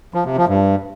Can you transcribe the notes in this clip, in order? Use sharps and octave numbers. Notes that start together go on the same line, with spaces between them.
F3
C3
F3
G2